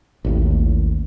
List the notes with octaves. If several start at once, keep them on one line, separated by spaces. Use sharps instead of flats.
A1 D#2 A2